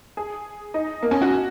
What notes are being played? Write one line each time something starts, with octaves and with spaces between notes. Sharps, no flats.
G#4
D#4
A#3
C#4
F#4